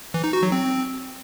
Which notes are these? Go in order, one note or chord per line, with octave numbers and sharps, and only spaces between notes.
E3
D#4
F#4
F#3
C4